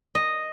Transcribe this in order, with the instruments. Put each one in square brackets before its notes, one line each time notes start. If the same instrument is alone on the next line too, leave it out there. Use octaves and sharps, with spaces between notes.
[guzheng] D#5